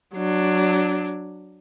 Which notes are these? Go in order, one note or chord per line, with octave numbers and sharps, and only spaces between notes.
F#3 D4